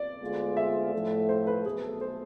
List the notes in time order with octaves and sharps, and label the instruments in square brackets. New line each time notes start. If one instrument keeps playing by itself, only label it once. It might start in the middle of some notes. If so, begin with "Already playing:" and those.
Already playing: [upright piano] D5
[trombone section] D2 D3 G#3 B3 F4
[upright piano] E5
[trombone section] A2 F3 A3
[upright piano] C5
B4
[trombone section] B1 B2 A3 [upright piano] G#4
[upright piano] A4
C5